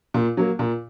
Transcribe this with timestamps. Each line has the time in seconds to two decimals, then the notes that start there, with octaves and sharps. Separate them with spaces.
0.14 A#2
0.37 F#3 A#3
0.59 A#2